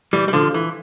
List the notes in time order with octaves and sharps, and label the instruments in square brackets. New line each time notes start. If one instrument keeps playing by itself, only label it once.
[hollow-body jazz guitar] E3 G3
G3
D3 F3
E3